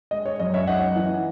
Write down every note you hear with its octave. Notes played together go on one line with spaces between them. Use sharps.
G#3 D#5
C#5
F#2 D#5
C#5 E5
D#4 D#5 F#5
E3